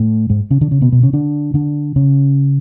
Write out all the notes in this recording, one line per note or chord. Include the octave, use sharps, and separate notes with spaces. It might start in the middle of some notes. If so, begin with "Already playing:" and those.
Already playing: A2 A3
G#2 G#3
C#3 C#4
D3 D4
C#3 C#4
B2 B3
B2 B3
C#3 C#4
D3 D4
D3 D4
C#3 C#4